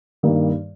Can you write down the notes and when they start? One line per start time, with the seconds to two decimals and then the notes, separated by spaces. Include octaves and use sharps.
0.23 G2 D#3 G3 A#3